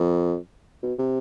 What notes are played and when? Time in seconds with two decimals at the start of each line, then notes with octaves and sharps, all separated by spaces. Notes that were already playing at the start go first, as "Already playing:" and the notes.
Already playing: F2
0.83 B2
0.99 C3